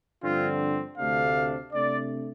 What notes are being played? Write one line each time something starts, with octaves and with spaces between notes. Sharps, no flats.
G2 D3 F3 C4 F4
D2 C3 A3 D4 F5
C3 A3 D4 D5